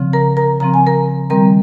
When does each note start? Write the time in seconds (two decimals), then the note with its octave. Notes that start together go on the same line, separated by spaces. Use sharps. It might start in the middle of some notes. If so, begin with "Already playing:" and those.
Already playing: C#3 F3 C4
0.13 A#4 A#5
0.37 A#4 A#5
0.60 C#3 F3 C4 A#5
0.74 G#5
0.87 A#4 A#5
1.30 D#3 G3 C4 A#4 A#5